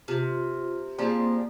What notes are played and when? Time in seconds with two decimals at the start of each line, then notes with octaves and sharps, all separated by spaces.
0.08 C3 F4
0.98 F3 G#3 A#3 C4 G4 D5